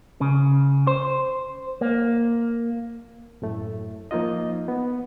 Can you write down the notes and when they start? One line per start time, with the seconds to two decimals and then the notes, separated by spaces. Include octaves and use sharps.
0.21 C#3
0.87 C5
1.81 A#3
3.42 F#2 A2 A3
4.11 F3 A#3 D#4 F4 D#5
4.68 B3